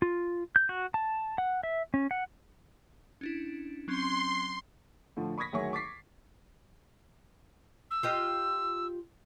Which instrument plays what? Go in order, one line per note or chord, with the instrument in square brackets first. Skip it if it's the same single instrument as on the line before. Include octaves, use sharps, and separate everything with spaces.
[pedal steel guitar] F4
G6
F#4
A5
F#5
E5
C#4
F#5
[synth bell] C#4 D4 E4
[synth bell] F#3 C4 C#4 [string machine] C6
[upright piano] A2 D3 F3
B5 C#6 D#6 G#6 A#6 B6
D2 D#3 F#3 G#4 E5 C#6
C#6 D6 A6 B6 C7
[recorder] E6
[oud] F4 G4 D#5